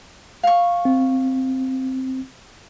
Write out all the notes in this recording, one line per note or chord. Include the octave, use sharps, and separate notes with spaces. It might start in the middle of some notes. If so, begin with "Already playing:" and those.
F5 C#6
C4